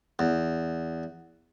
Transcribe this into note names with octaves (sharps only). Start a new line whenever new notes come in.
E2